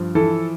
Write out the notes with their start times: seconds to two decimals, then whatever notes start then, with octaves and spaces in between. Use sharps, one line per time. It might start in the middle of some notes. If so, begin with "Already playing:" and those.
Already playing: G2 F3
0.15 E3 A4